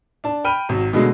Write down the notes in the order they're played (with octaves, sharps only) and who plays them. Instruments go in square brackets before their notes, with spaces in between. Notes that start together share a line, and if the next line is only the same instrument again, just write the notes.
[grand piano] D4 A5
G5 B5 F6 D#7
G#1 F#3
B2 D3 F#3 G#3 A3